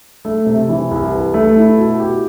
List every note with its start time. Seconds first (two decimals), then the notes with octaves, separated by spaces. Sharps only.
0.25 A3
0.46 C3
0.69 E3
0.91 C2
1.12 B4
1.34 A3
1.56 E4
1.78 B2
2.00 G4